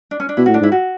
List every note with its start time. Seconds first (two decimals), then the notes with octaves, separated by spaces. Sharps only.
0.11 D4
0.20 C#4
0.29 D4
0.37 B2 E4
0.46 A2 F#4
0.54 D4
0.61 G#2 E4
0.72 F#4